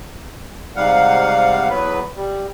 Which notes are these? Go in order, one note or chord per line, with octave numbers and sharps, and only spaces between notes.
G#2 C3 G3 F5 F#5
E2 F#3 B3 B4
G3